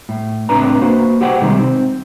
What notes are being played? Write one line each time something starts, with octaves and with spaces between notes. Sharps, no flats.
A2
C#2 A2 C4 D4 B4 A#5
A#3 F#4 B4 C5
F#4 G4 C5 F#5 G5
C3 D#3 G3 G#3
C4